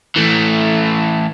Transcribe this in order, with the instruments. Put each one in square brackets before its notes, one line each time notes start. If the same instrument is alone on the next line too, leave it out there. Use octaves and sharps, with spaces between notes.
[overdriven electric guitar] E3 A3